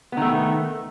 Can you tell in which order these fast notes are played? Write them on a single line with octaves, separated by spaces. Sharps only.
B3 D#3 A3